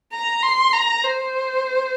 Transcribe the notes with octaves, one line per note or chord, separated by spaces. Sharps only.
A#5
C6
A#5
C5